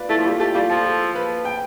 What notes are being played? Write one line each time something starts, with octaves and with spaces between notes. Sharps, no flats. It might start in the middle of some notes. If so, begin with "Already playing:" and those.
Already playing: F4 B4 D5
A3 E4
F3
G3 F4
A3 G4
G3 F4
F3 A4
A4
B4
G5